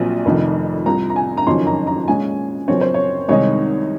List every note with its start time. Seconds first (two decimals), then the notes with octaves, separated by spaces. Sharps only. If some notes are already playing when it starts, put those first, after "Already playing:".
Already playing: A#1 A#2 F#3 C4
0.25 F1 F2 D#3
0.86 C2 C3 F3 A#5
1.10 A#5
1.16 G#5
1.37 A#5
1.46 F#1 F2 D#3 F#3 C#4 C6
1.67 A#5
1.87 A#5
2.08 A#2 G#3 C#4 F4 G#5
2.68 F#1 F#2 F3 C4 C#5
2.81 C5
2.94 C#5
3.29 C2 C3 D#3 G#3 D#4 C#5